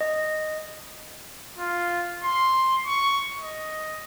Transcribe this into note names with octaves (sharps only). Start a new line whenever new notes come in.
D#5
F4
C6
C#6
D#5